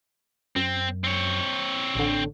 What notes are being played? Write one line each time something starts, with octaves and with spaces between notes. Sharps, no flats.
F#2 C4
C4 C#5
A1 D3